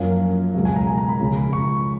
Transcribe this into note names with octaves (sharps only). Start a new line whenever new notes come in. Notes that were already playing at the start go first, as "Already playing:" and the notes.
Already playing: F#2 F3 A#3 C#4 F5
C#2 B2 F#3 F5
G#5
A#5
G#5
A#5
B5
C#2 C#3 F3
C#6